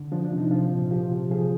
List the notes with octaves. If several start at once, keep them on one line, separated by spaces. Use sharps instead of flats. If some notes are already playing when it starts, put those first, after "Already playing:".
Already playing: D3
F3 D4
D4
C3
D#4
F3 F4
A#2
F3 G4
C3
F3 G#4